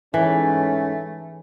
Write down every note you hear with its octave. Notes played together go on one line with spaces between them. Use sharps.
G#2 E3 A3 C#4